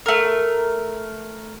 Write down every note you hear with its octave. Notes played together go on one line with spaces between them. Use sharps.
A3 A#4